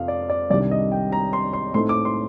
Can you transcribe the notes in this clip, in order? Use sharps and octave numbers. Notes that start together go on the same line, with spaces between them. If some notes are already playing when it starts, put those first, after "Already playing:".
Already playing: F2 C3 F5
D5
D5
C2 C3 D#3 G3 D4 D5
D#5
G5
A#5
C6
C6
A2 A3 C4 D#4 C6
D6
C6